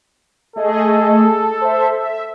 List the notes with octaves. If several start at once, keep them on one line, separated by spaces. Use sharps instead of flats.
A3 G#4 A4 D#5
C5 E5
E5